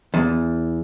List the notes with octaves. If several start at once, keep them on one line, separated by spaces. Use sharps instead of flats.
E2